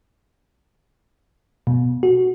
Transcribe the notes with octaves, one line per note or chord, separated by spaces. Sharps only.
B2
F#4